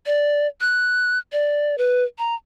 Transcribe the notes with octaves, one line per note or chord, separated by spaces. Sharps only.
D5
F#6
D5
B4
A#5